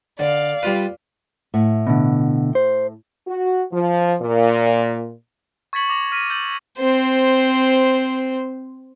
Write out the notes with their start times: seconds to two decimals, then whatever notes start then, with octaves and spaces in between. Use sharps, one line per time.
0.19 D3 D5 F5
0.63 G3 F4 B4
1.54 A2 E5 F#5
1.87 B2 D3
2.55 C5
3.28 F#4
3.72 F3
4.21 A#2
5.73 C#6 G#6 A6 B6 C#7 F#7
5.89 D6 A#6 F7
6.12 F6 A#6 B6 D#7
6.30 E6 G6 A6 F#7
6.78 C4 C5